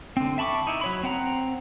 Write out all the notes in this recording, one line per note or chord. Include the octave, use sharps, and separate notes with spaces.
D3 C4
E5 A5 B5 C#6 D6
D#4 E4
F#3 C#5 B5
C4 F#5 A#5